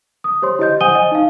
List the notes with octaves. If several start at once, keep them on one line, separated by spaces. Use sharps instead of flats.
D#6
G4 C5 C#5 C6
E4 G4 D#5 G6
C5 F#5 G#5 D#6 D#7 G7
D#5 G#5
D#4 F5